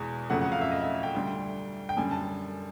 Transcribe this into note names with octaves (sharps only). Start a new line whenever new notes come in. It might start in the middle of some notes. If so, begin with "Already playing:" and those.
Already playing: E2 B2 G#3
F2 C#3 F#3 A3 F#5
F#5
F5
E5
D#5
E5
G5
D2 D3 G3
G5
F#2 D3 G3 G#5
A5